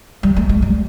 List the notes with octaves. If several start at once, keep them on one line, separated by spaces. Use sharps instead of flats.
G3
A3
G#3
G3